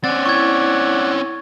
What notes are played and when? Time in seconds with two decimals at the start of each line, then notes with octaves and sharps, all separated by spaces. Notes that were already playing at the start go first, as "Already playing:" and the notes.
0.04 C4 C#4 D5 F#5 A6
0.26 E4 C#6 G#6